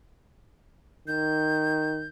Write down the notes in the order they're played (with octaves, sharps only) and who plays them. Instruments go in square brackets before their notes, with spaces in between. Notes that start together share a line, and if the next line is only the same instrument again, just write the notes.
[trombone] D#3 [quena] G6